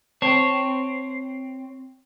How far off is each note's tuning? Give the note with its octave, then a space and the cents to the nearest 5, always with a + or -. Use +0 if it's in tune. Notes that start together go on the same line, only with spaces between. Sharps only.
C4 +0 C#5 +0 A5 +0